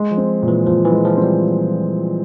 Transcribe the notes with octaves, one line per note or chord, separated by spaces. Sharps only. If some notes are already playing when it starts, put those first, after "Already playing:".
Already playing: G#3
F3
C4
A#2
E3
A#2 F3
E3
G#3
F3
C4
G3